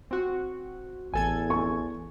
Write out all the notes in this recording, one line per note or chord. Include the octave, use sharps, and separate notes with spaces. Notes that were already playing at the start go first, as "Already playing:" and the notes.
C4 F#4
A1 E2 A4 G#5 G#6
C#6